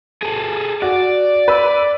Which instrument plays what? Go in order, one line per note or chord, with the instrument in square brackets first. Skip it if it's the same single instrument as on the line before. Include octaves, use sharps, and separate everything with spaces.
[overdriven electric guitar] G#4 A4
[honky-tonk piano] F#4 [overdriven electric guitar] D5
[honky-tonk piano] B4 E6